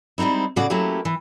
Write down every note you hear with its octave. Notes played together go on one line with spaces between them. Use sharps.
G3 G#3 C4 D#4 E4
A2 C#3 F#4 G#4 D5
F#3 A3 A#3 C#4 E4 G4
E3